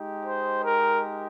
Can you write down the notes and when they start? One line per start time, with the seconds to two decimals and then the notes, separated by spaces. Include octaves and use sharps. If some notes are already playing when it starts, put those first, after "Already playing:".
Already playing: G#3 D#4 G4
0.23 C5
0.64 A#4